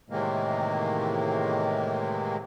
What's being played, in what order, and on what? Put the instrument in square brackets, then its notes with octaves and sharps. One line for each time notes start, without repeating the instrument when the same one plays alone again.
[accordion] A2 C3 D#3 E3 G#3 A#3